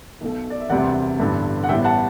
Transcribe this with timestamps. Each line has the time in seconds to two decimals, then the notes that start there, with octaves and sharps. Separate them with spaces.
0.21 B1 B2 A3
0.50 D5
0.60 E5
0.70 E1 D2 C3 G3 B3 D5 F#5
1.19 A1 G2 D3 G3 B3
1.64 F#5
1.68 A1 A2 G3 B3 E5 G5
1.84 F#5 A5